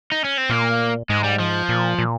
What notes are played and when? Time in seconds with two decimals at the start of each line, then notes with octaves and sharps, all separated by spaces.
0.12 D#4
0.24 C#4
0.38 C4
0.49 A#2 A#3
1.09 G#2 G#3
1.24 G3
1.40 F3
1.69 A#2
1.99 A#2